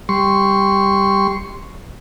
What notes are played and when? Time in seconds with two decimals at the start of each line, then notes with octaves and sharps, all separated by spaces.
0.09 G3 C6 C#6